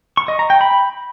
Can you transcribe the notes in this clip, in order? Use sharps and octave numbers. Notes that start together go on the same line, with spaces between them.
C#6
D#5
A#5
G5
B5